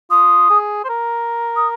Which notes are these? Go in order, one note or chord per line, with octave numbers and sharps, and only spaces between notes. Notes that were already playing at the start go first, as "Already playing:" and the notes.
F4 D#6
G#4
C5
A#4
D#6